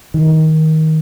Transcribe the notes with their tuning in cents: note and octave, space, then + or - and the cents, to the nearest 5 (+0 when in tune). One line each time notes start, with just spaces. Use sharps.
D#3 +20